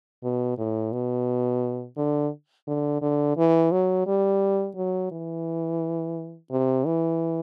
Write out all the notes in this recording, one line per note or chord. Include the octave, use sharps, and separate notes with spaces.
B2
A2
B2
D3
D3
D3
E3
F#3
G3
F#3
E3
C3
E3